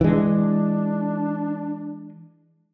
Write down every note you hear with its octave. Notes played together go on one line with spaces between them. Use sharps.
E3 G#3 D4